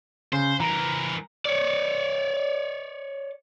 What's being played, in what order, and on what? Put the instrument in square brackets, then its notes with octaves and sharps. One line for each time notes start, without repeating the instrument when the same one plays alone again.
[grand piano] C#3 [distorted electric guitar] C5
[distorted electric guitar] E3 A#4 [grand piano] A#5
[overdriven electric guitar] C#5 D5